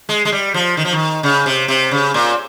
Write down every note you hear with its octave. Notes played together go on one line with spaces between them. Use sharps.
G#3
G#3
G3
F3
D#3
F3
D#3
C#3
C3
C3
C#3
A#2